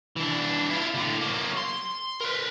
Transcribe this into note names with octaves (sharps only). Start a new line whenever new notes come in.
E3 D4
E4 F4
A2 D3
F#3 A#3
C6
A#4 B4